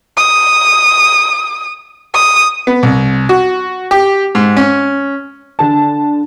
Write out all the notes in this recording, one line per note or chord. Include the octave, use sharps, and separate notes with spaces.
D#6
D#6
B3
C2
F#4
G4
G#2
C#4
D3 A5